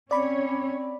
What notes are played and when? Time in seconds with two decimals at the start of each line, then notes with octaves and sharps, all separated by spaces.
0.11 C4 C#4 C#5 D5 B5